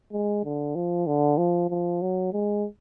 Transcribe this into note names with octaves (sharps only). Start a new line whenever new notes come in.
G#3
D3
F3
D3
F3
F3
F#3
G#3